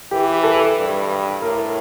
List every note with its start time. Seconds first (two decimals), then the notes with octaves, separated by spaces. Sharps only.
0.11 E3 G4
0.44 A4
0.77 G2
1.42 A2 A#4